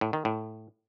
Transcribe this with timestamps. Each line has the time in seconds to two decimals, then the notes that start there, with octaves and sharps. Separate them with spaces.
0.01 A2
0.13 D#3
0.25 A2